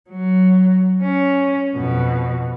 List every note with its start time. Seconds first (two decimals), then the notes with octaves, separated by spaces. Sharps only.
0.10 F#3
1.02 C#4
1.76 F2 B2